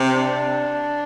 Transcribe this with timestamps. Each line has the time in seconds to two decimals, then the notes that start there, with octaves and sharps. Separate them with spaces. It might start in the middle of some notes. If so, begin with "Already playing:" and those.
Already playing: C3
0.14 D4